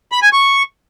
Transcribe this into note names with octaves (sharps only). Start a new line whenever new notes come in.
B5
G#5
C#6